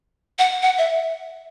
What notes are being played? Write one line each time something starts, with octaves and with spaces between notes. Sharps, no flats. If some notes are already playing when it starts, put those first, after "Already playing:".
F#5
F#5
E5